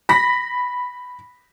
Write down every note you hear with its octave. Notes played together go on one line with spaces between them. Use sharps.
B5 A#6 B6